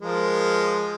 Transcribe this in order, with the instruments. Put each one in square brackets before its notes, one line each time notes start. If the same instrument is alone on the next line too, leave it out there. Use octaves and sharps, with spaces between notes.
[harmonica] F3 G#3 A#4